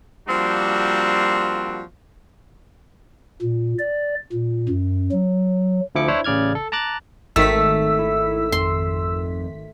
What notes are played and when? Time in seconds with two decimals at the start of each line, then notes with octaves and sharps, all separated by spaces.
0.28 F3 G3 A#3 C4 D4 F#4
3.42 A#2
3.79 D5
4.33 A#2
4.69 F#2
5.11 F#3
5.95 D2 F3 E4 D6 C#7
6.08 D4 E4 C5 C#5
6.24 A1 C#3 D5 F6 G#6
6.55 A4
6.72 A5 A#5 D6 F#6 A6
7.36 G#1 D#3 A3 E6 B6
7.99 E4
8.52 F2 C6